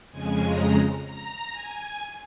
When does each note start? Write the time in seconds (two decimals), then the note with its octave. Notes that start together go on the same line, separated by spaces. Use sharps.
0.11 F2 C#3 G#3 G#5
0.43 A#5
1.05 A#5
1.51 G#5